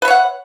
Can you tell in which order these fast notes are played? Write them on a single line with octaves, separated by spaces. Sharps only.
B4 E5 C#5 F#5